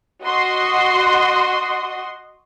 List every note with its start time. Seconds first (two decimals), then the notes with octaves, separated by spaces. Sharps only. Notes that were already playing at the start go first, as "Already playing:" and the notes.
0.23 F#4 D#5 C6